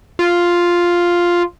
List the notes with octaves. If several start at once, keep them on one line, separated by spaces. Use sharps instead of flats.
F4